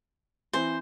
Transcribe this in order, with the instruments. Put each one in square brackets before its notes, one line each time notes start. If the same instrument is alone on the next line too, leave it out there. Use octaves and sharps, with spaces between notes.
[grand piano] E3 C4 [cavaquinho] C5